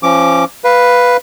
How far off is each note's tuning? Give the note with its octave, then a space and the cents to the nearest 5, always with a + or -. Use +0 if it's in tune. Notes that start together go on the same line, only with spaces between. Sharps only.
F3 -25 C#4 -15 D6 +0
B4 +0 F5 +0